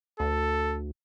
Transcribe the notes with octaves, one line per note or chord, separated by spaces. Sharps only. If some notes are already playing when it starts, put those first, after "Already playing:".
D2 A4